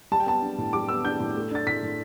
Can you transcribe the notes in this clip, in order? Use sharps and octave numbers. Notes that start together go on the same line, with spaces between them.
G3 A5
G5
B3 A5
D4
A2
G3 D6
B3 E6
D4 G6
A2
A3
D4 A6
A2 B6
A2